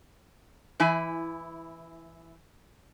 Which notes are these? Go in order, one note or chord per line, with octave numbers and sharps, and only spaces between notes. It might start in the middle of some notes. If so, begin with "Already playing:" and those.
E3 E4 G#5